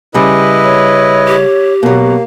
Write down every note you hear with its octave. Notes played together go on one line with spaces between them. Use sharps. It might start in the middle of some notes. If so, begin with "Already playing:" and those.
C#3 G3 E4 B4 D#5
C#5
G4
B2 F#3 A#3